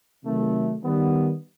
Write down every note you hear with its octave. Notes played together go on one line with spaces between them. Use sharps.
C3 D#3 F#3 A3
D#3 G3 B3